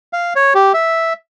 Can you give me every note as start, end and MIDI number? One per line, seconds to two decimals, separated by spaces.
0.13 0.33 77
0.36 0.54 73
0.55 0.73 67
0.74 1.13 76